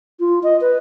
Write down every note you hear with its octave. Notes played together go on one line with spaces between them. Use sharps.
F4
D#5
B4